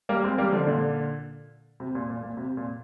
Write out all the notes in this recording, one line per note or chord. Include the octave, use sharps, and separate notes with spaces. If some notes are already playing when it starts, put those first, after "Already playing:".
G3 A#3
G#3 C4
G3 A#3
D3 F3
A#2 D3
C3
A#2
A#2
A#2
C3
A#2